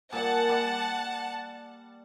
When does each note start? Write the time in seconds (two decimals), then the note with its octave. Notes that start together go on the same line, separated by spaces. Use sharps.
0.13 A#2 G3 F#5 G#5 A5
0.49 G3 B5 D6